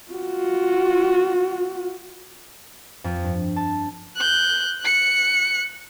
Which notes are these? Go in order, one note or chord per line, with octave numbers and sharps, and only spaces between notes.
F4 F#4
F2
G2
A5
F#6 G6
F#6 C#7